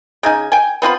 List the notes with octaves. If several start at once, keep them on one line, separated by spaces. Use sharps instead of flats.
C#3 D#4 G#5
G5 G#5
B3 C4 F4 B5